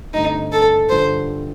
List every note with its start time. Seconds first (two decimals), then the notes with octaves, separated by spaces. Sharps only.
0.14 G2 D3 A3 C4 D#4
0.52 A4
0.90 G2 D3 F3 C5